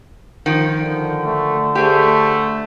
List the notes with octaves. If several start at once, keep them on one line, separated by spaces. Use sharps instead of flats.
D#3 F3
D3
A3
A3 G4 G#4 C5